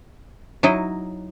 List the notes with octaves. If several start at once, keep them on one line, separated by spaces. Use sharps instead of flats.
F#3 D#4 E4 D#5